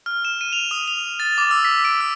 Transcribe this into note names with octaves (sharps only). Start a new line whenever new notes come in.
F6
E7
D#7
F7
D#6
F7
A6
D6
E6
B6
D7
E6